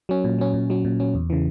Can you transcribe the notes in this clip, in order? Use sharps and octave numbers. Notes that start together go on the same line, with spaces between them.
F#3 C#4
A#2
F#3 C#4
A#2
F#3 C#4
A#2
F#3 C#4
E2
C#3 E3